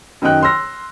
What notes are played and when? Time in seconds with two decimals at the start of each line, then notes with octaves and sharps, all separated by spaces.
0.22 F#2 D#3 D#5 G5 F#6
0.43 C6 E6 F6 A#6